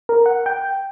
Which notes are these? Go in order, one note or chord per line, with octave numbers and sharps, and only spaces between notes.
A#4
F#5
G5